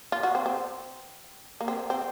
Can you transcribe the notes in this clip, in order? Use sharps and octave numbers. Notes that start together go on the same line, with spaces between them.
F4
F#4
C4
C4
A#3
C4
C4